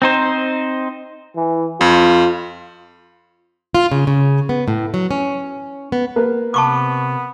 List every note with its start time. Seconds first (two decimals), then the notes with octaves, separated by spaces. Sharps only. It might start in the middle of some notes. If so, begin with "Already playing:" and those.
0.02 C4 D#4 C5
1.36 E3
1.81 F2 F4
3.75 F4
3.92 C#3
4.07 C#3
4.49 B3
4.68 A2
4.94 F#3
5.11 C#4
5.92 B3
6.16 A#3 B4
6.54 C3 B3 A5 C#6 D6